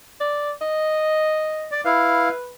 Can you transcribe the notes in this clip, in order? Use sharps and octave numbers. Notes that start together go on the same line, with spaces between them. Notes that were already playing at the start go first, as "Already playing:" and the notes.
D5
D#5
D5
E4 B4 F5